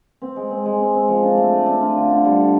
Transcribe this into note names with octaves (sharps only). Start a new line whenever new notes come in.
C4
G#3
C4
G#3
C4
C4
F3
D4
A3
A3
D4
F4
D3
D3
G3
D3